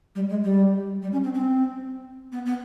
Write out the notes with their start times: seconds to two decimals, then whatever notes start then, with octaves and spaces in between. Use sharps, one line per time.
0.15 G3
0.29 G#3
0.44 G3
1.02 G3
1.13 C#4
1.24 C4
1.34 C4
2.32 B3
2.46 B3